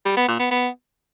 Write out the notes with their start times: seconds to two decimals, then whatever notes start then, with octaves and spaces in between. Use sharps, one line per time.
0.05 G3
0.17 B3
0.28 A#2
0.39 B3
0.51 B3